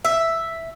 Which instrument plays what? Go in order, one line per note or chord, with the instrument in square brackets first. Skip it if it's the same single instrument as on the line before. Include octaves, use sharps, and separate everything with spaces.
[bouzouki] E5